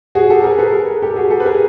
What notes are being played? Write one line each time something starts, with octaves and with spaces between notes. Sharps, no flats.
F#4 G#4
G4 A4
G#4 A#4
A4 B4
G#4 A#4
G4 A4
F#4 G#4
G4 A4
B4
G#4 A#4